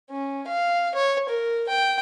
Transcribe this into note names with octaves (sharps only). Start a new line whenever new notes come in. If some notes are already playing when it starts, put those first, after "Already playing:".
C#4
F5
C#5
A#4
G5